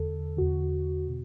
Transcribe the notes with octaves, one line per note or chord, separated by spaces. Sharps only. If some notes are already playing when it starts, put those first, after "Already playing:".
Already playing: E2 D3 A4
E2 D3 F#4
B2